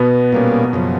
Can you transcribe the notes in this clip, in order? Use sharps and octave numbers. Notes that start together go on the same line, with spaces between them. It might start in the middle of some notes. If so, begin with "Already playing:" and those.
Already playing: B2 B3
A#2 G3 A#3 C#4
F#2 C#3 F3